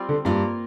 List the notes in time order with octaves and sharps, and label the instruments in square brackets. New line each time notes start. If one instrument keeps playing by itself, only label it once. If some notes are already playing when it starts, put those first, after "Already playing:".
Already playing: [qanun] G3 C4 F4
[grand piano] D3
[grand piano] G2 [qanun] A#3 F4 A#4